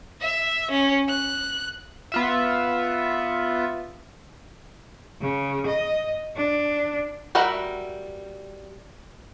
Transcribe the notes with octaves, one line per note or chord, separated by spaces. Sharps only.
E5
C#4
F#6
B3 F4 E5
C#3
D#5
D4
G3 F#4 A#4 E5 F#5